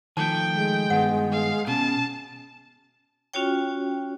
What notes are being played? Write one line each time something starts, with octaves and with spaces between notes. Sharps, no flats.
D#3 F3 A3 G5 A5
G#3
G2 D#3 B3 F#5
F5
B2 C#4 A5
C#4 F4 F#4 C#5 G5